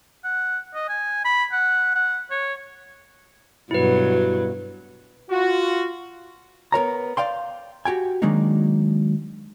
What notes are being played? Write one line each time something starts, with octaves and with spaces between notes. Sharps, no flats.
F#5
D#5
G#5
B5
F#5
F#5
C#5
G2 B2 F#3 E4 B4
F4 F#4
B3 A#4 C#5 A#5
D5 F5 G5 C6
F#4 G4 G5 G#5
D#3 F#3 G#3 A#3 D4 D#4